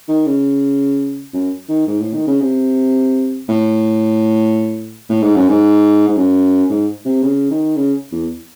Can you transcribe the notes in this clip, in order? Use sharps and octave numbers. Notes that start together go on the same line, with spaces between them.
D#3
C#3
F#2
D#3
G#2
A2
D#3
C#3
C3
A2
A2
G#2
F#2
G#2
G#2
F#2
G#2
C3
C#3
D#3
C#3
E2